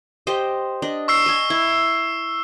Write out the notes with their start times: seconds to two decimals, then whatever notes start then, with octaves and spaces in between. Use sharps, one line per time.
0.27 G4 C5 D#5
0.82 D4 D#5
1.08 C#6 E6 C7
1.26 D#5 G#5
1.50 E4